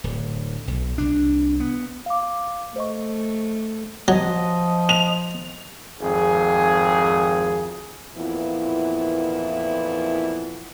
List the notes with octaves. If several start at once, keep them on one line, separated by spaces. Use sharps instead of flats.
D1
B1
C2 D4
B3
F5 D6
A3 C5 D#5 C#6
F3 F#3 D#5
F7
G#1 F2 G#4
F2 A#2 E3 B3 E4